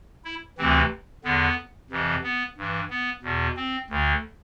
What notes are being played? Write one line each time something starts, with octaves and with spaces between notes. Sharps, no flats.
E4
D2 C3 E3 C4
E2 D3 B3
F2 C3 E3
B3
G2 E3
B3
E2 B2
C4
D2 D3